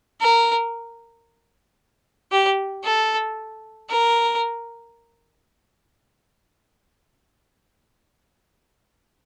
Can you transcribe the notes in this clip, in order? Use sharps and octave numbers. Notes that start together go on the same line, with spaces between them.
A#4
G4
A4
A#4